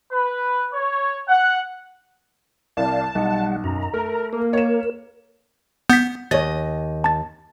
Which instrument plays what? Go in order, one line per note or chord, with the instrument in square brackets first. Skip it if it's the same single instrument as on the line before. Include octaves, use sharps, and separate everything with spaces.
[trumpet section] B4
C#5
F#5
[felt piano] C2 [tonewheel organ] D5 F5 [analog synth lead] A5
[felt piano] B1 [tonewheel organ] G3 F#5
[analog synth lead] F#2 [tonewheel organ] A#5
[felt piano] A3 [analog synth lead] A#4
[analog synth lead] A#3 [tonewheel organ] A#4
[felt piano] C#5 E7
[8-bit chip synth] B3 [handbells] G6 B6
[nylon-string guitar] D#2 D#5 [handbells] C#5 A6
[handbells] A5 A6